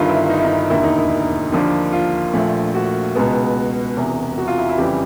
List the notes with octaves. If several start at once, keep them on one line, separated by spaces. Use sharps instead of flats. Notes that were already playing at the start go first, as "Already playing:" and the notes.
Already playing: G1 G2 D#3 F4
E4
D#4
E4
D#4
E1 D#2 D3 E4
D#4
E4
D#2 D3 F3 A#3 D4
F4
A#1 A#2 F3 A3
F#4
C#2 B2 G#3 B3
E1 E2 C3
F#4
F4
E4
E4
F2 C#3 E3 G3 G4